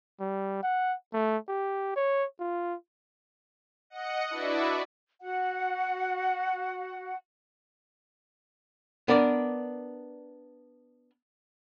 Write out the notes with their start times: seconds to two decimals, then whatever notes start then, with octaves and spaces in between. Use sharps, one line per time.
0.20 G3
0.63 F#5
1.13 A3
1.48 G4
1.96 C#5
2.40 F4
3.90 D#5 F#5 C#7
4.29 D4 E4 F#4 B4 D5 E5
5.22 F#4 F#5
9.08 B3 D4 A#4 D5